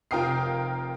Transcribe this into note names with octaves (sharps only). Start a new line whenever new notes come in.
F1 F4 A#4 G5 D#6 C7